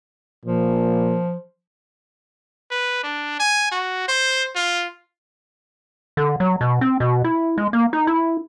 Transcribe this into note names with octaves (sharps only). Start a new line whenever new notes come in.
A#2 F3
B4
D4
G#5
F#4
C5
F4
D3
F#3
B2
C4
B2
E4
G#3
A#3
D#4
E4